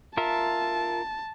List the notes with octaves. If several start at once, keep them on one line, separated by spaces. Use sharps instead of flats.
F4 A#4 E5 A5